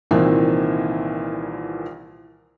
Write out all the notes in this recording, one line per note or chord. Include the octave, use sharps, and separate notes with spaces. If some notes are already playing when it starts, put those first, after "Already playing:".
C2 A#2 D#3 E3 A#3 C4